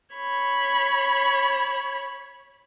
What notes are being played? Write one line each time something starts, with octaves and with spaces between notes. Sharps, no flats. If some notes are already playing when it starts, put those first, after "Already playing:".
C#5 B5